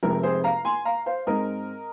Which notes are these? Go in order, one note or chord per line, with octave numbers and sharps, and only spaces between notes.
F1 F2 C3 G#3 A#4
G#4 C5
F5 A#5
G#5 C6
F5 A#5
C5 F5
G#2 G#3 C4 A#4 D#5